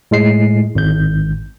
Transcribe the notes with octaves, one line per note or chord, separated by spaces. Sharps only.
A2 G#3 C7
G#1 G6